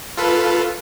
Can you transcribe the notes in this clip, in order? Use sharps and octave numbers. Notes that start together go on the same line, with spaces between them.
F4 A4 B4